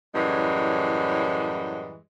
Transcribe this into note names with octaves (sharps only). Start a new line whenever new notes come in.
F#2 A2 E3 G3 G#3